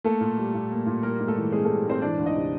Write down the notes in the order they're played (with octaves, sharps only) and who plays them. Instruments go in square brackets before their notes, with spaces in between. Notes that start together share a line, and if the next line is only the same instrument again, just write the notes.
[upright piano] A3 A#3 A4
A#2
G3
A#2
A#3
A#2
G3 A#3 A#4
G#2
A3 A4
E3
G#3 C4 G#4
G3 A3 A4
G#2 C4 C5
E3 D4 D5
D2
D#4 D#5
C3